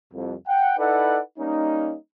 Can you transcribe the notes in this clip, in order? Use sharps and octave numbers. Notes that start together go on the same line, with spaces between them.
C2 F2
F#5 G5
D#4 E4 A4 B4 D5 F#5
G3 A#3 C#4 D#4